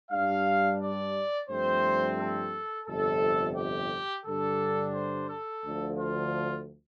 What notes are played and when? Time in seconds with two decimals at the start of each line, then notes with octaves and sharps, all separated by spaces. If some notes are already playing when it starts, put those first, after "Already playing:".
0.11 G2 G3 D4 F5
0.80 D5
1.49 G2 F3 A3 C4 C5
2.18 A4
2.87 G1 F2 C3 A4
3.56 G4
4.26 G2 D3 G3 D4 A4
4.94 C5
5.29 A4
5.64 D2 D3 F3
5.98 F4